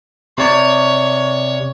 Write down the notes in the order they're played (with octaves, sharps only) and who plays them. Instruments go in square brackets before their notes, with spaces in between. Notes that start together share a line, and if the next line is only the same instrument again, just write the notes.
[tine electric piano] C3 D5 [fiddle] C#5